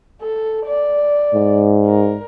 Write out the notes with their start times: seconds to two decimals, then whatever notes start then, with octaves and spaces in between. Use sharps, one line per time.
0.21 A4
0.66 D5
1.34 G#2
1.86 A#4